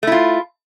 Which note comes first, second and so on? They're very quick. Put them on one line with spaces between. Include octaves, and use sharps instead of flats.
A3 E4 F4